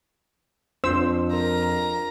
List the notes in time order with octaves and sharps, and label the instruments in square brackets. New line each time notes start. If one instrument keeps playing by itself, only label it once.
[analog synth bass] F2 [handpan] D4 F4 [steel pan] C5 E6
[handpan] A#4 [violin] A#5